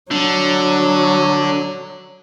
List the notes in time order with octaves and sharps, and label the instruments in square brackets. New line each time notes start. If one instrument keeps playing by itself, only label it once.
[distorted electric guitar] D3 [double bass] F#3